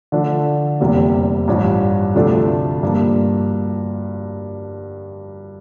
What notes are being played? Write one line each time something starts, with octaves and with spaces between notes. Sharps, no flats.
D3 F3 A3 D4
F1 E2 C3 G3 A#3
A1 G2 F3
D2 C3 F3 A3 D4
G2 F3 A#3